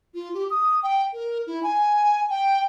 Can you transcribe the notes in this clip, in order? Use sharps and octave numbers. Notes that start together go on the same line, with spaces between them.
F4
G4
D#6
G5
A#4
E4
G#5
G5